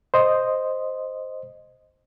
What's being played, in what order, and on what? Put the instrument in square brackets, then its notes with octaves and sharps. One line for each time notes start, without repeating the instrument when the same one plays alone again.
[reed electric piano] C5 D#5